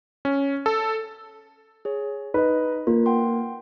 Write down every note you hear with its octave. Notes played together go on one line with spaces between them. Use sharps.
C#4
A4
G#4 C#5
D#4 B4 D#5
A#3 F4
F#5 G5 C6